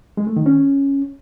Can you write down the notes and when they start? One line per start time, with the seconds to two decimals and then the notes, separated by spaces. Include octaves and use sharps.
0.17 G#3
0.27 A3
0.36 D#3
0.46 C#4